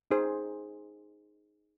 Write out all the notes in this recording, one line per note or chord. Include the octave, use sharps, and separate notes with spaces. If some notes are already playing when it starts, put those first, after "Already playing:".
D#4 G#4 C5